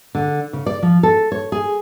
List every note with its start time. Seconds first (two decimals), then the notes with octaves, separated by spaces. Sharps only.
0.15 D3
0.53 C#3
0.66 D5
0.83 F3
1.03 A4
1.32 C#5
1.52 G#4